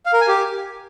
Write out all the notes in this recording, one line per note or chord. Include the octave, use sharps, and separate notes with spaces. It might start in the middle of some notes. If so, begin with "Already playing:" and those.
F5
A#4
G#5
G4